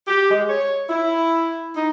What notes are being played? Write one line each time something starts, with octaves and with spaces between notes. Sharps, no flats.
G4
G#3
C#5
E4
D#4